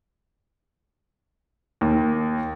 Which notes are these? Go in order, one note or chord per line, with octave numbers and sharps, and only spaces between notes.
D#2